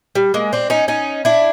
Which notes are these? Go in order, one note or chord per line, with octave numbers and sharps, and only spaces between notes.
G3
G#3 A#3
C4 D4
C#4 D#4
C#4 D#4
D4 E4